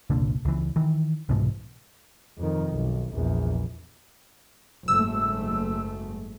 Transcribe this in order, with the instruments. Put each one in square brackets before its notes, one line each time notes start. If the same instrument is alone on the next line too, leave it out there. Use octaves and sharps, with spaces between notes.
[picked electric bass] F#1 C2 A#2 D3
C#2 E3
D#3 E3
C2 G#2 B2 E3
[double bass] F2 D#3
B1
A#1 E2
[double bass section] F#1 G#2 A3 [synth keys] E6